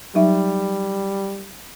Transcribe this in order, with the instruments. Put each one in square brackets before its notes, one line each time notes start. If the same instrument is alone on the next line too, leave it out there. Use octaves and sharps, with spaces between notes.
[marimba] F#3 D#4 E5 [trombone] G3